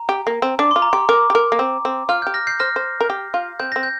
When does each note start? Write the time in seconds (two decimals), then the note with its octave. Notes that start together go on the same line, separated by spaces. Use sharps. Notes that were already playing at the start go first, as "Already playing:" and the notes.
Already playing: A#5
0.09 G4
0.27 A#3
0.42 C4
0.59 D4 D6
0.71 F4 C6
0.82 A#5
0.93 G4 C6
1.09 A#4 D6
1.30 G4
1.35 A#4
1.52 A#3
1.59 C4
1.85 C4
2.09 F4 F6
2.22 G4 G6
2.34 F6 A#6
2.47 G6 C7
2.59 C5 F6 A#6
2.76 C5
3.01 A#4
3.10 G4
3.34 F4
3.59 C4 G6
3.72 C4 A#6
3.83 G6